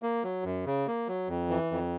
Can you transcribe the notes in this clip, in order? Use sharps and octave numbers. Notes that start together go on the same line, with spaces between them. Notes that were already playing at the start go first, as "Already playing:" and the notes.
A#3
F#3
F#2
C#3
A#3
F#3
F2
E3
F2